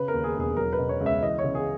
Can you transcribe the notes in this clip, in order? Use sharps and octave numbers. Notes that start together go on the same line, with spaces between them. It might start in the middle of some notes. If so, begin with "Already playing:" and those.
Already playing: C#3 B4
A#4
D#2
G#4
E1 G#4
F#3 A#4
B4
B2
C#5
C#2
E5
E3 D#5
C#5
C#3
G#4